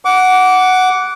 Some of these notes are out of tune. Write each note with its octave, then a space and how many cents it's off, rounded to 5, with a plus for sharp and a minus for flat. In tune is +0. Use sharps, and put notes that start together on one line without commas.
F#5 +0 D6 -20